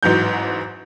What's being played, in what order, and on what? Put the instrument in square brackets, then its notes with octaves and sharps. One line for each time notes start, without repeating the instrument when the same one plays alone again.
[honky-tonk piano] A1 G#2 E3 F#3 G6